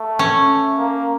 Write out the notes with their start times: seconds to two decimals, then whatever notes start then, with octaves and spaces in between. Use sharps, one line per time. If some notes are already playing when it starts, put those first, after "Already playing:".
Already playing: A3
0.19 C#4
0.78 A#3